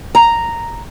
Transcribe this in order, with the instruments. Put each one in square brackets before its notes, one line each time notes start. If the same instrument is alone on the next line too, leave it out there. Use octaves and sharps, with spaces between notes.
[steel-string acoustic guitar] A#5